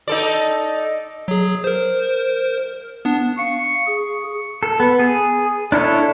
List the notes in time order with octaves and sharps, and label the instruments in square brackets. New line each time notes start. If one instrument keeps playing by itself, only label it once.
[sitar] D#4 A4 D5
[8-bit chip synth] F#3 G#4
A#4 C5
B3 D4
[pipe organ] F5 [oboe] C#6
[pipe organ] G#4
[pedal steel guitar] A4
B3
G#4
D4 E4 A4 C#5